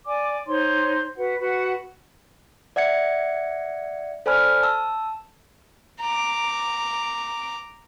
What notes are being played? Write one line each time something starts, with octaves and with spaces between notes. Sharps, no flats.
D5 G#5 D6
D#4 C5 C#5 C6
F#4 B4 F#5
F#4 B4 F#5
D5 E5 F#5 G#6 C#7
A4 C5 D5 G#5 B5 F6
A5 E6
A#5 D6